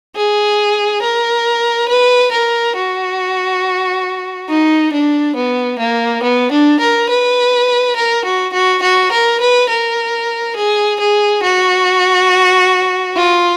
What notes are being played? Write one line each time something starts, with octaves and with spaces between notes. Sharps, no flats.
G#4
A#4
B4
A#4
F#4
D#4
D4
B3
A#3
B3
D4
A#4
B4
A#4
F#4
F#4
F#4
A#4
B4
A#4
G#4
G#4
F#4
F4